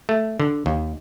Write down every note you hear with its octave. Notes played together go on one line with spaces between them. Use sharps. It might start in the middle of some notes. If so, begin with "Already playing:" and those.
A3
D3
D#2